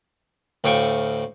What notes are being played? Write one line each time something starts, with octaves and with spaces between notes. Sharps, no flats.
D2 A2 F5 G5 C#6